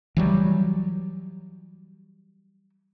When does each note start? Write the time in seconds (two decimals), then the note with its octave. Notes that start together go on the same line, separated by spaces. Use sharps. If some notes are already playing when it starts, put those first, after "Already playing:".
0.17 E3 F#3 G3